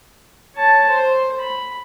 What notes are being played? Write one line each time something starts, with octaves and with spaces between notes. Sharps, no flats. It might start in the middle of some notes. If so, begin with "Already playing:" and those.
C#5 A5
C5
B5